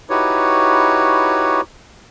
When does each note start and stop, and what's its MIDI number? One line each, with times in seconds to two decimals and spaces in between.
0.10 1.61 63
0.10 1.61 64
0.10 1.61 66
0.10 1.61 67
0.10 1.61 71
0.10 1.61 73